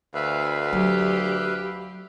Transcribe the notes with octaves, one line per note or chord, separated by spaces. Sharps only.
D2 B4 E5 F5
F#3 G4